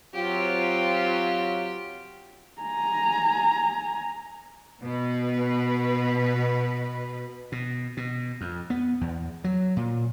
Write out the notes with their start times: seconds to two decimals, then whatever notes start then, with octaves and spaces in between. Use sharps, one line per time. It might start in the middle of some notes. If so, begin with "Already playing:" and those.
0.14 F#3 C4 F4 G4
2.62 G#5 A#5
4.83 B2 B4
7.52 B2
7.97 B2
8.41 F2
8.70 B3
9.01 E2
9.44 F#3
9.77 A#2